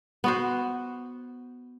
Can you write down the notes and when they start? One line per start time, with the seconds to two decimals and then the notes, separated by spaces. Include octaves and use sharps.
0.24 B3 F#4 C5